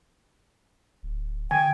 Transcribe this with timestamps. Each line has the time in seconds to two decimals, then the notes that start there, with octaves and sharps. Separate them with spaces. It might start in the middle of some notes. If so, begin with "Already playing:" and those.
1.03 D1
1.51 D3 G5 G#5